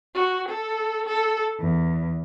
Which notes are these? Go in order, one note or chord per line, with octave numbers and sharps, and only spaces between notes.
F#4
A4
A4
E2